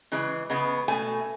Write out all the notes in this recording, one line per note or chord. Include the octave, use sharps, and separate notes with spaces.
C#3 E3 G#3
C#3 G#3 B3
B2 A3 G#5